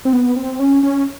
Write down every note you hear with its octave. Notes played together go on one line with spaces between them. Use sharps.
C4
B3
C4
C#4
C#4